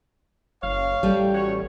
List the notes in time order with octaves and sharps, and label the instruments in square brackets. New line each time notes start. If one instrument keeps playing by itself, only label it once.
[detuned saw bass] F#1 [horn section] C#5 F5
[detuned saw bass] A1 [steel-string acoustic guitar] G3 A3 G4
[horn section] F#4 C#5